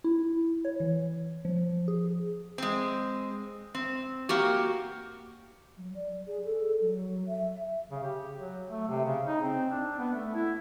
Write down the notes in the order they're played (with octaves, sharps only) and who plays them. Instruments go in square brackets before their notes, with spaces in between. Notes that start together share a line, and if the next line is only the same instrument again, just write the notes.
[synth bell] E4
C#5
E3
F3
G#4
[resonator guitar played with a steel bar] G#3 C4
C4
A#3 F#4 G4
[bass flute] F#3
D5
G#4
A4
F#3
E5
[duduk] C#3
G4
F#3
A3
C3
C#3
D#4
C4
D4
B3
A3
E4